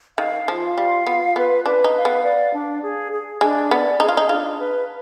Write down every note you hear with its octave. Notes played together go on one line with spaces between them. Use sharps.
D#3 F5
F3 F4
G3 F5
B3 F4
B3 B4
D4 B4
D#4
F5
B3
D5
D4
G#4
G#4
G#3 D4
B3 D5
D#4 G#4
F4
D#4
D4 F4
B4